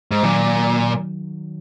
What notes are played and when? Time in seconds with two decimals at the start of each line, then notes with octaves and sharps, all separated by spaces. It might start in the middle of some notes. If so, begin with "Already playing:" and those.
0.11 G#2
0.23 A#2 D#3 F#3